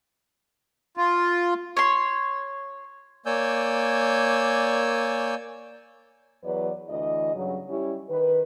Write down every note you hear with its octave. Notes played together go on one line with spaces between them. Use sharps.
F4
C#5 C6
A#3 C#5 D5 G#5 E6 G6
E2 F#3 B4 C#5 D5
D2 E3 D#5
G2 C#3 F#3
G3 C#4 E4 G4
D#3 B4